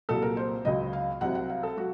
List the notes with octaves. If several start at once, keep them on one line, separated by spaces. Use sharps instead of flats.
C2 A#2 F#3 A4
A#4
C5
C#2 C#3 F#3 D#5
F5
C2 C3 F#3 F#5
F#5
F5
A4
F#3 F#4